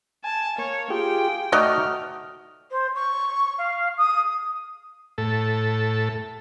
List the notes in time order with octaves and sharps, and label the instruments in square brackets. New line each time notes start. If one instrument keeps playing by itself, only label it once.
[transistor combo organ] G#5 [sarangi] A5
[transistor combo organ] A#3 [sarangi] C#5
[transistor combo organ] F4 G4 G#4 [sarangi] G5
[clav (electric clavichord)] A3 D#4 [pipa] F#4 D5 D#5 [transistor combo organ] F6
[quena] C5
C#6
F5
D#6
[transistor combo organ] A2 A4